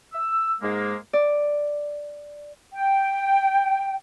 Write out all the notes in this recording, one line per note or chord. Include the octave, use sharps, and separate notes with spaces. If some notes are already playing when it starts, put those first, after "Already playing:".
E6
G#2 G#3 A#3
D5
G5